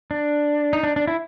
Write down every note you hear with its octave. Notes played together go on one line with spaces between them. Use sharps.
D4
D#4
D4
D4
E4